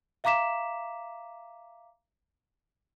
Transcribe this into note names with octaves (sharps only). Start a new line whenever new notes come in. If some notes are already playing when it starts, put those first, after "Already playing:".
E5 F5 A#5 D6 B6 E7